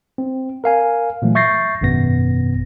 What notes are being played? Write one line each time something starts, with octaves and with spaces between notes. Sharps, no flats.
C4
A#4 F5 G#5
A#2 E3 F#3 A3
E5 C#6 G6 A6 A#6 C7
G#1 F#2 B2 B3 A#6